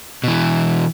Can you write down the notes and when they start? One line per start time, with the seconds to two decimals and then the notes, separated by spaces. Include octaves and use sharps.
0.24 B2 E3